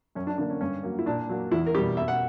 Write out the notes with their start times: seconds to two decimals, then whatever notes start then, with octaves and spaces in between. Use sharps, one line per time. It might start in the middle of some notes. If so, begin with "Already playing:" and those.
0.15 F#2 C#4
0.27 D4
0.38 D3 A#3 D4
0.50 C#4
0.61 G2 C#4
0.83 F#3 A#3
0.99 E4
1.06 A#2 D4
1.29 F#3 A#3
1.52 E2 E4
1.66 A#4
1.74 B2 G4
1.78 G3
1.97 B2 E5
2.08 F#5